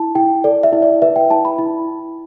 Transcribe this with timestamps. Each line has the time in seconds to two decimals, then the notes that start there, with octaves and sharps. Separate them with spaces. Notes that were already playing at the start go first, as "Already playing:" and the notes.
Already playing: E4 A5
0.15 E4 G5
0.44 A4 D5
0.63 E5
0.73 E4
0.82 D5
1.02 B4 E5
1.16 G5
1.30 E4 A5
1.45 B5
1.58 E4